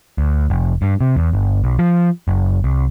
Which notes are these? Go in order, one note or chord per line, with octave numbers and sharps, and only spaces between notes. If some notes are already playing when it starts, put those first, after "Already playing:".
D2
F1
G2
C3
E2
G1
B1
F3
F#1
C2